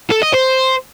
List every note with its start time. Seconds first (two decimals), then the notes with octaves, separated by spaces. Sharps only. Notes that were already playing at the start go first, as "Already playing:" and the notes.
0.10 A4
0.22 D#5
0.33 C5